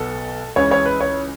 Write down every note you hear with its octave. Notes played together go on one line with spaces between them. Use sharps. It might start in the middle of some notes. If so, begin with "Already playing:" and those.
Already playing: B1 B2 A4
C#2 C#3 E3 C#5
C#5
B4
C#5